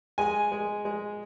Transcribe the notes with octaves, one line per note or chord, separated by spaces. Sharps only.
G#3 G#5
G#3
G#3